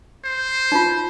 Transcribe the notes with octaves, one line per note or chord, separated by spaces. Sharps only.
C5
D#4 F4